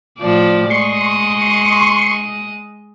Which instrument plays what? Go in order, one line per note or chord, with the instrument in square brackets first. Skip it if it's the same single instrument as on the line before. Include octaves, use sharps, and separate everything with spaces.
[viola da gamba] A2 F3 D5
[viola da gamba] G#3 D#5 [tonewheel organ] C6 C#6